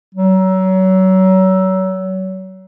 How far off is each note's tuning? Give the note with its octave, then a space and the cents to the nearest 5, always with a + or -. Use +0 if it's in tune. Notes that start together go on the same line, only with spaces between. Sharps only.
F#3 +30